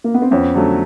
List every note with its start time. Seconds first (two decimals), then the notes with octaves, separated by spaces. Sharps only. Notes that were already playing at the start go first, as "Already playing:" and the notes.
0.04 A#3
0.14 B3
0.22 C4
0.31 F2 B3 C#4
0.54 D3 F#3 A3